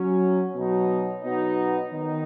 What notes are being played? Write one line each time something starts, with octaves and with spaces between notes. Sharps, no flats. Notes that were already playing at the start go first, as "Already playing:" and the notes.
Already playing: F#3 C#4
B2 F#3 D#4
B2 F#3 B3 D#4
D#3 B3 D#4